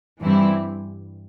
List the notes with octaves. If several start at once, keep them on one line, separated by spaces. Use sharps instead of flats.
G2 E3 G3 C4 E4